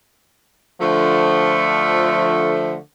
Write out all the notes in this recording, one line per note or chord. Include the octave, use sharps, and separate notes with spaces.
D3 F3 A3